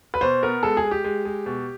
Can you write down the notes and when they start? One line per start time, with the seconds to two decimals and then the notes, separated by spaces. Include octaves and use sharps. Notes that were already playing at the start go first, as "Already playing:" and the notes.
0.14 B4
0.21 B2 C5
0.43 B3 A#4
0.63 G#3 A4
0.77 G#4
0.84 G#3
0.91 G4
1.04 G#3
1.25 G#3
1.46 B2